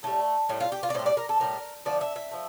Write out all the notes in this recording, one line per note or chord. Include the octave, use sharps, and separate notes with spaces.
A2 G3 A3
A2 G3
F4
G4
F4
D5
A2 G3 C5
D5
A#4
A4
A2 G3 A#4
D3 F3 A3 D5
E5
E5
F3 A3